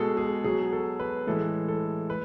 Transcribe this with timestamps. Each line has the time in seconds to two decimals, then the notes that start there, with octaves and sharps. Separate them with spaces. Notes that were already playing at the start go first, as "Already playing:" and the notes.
Already playing: B2 G#3 G#4 A4
0.17 G#4
0.44 B2 F#3 G#4
0.73 A4
0.99 B4
1.27 A2 E3 G#3 A4
1.68 A4
2.10 B4